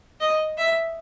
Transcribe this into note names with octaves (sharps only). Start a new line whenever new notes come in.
D#5
E5